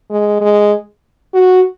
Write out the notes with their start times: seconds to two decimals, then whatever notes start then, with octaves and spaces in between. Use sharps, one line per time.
0.10 G#3
0.41 G#3
1.34 F#4